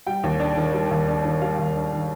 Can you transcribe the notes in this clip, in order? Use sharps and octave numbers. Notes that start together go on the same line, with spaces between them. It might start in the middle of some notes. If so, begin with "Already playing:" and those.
G3 G5
D#2
D4
D#3
G3
D#2
D4
D#3
G3 F5
D#2
D4
D#3